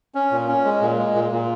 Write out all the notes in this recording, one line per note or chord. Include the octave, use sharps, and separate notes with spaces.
C#4
A#2
C#4
G#3
A#2
G#3
A#2
A#2